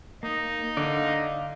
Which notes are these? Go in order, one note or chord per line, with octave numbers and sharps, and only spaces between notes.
A#3 D#4
D3 D5 D#5 F5